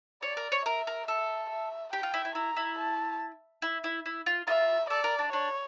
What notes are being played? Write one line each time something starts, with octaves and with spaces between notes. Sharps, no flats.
C#5 D5
A#4
C#5
A#4 E5
A#4
A4 E5
E5
G4 G5
F4
E4
E4
E4 A#5
E4
A5
E4
E4
E4
F4
F4 E5
A4 D5
A#4
D4
D4 C#5